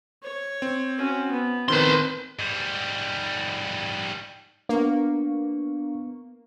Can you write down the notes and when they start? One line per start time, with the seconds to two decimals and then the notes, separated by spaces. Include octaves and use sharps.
0.23 C#5
0.62 C4
0.99 C#4 F#4
1.32 B3
1.68 D#3 C4 B4 C6
2.39 G#2 G3
4.69 A#3 B3 D4 F5 C#6